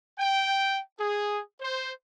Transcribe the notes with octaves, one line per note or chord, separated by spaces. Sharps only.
G5
G#4
C5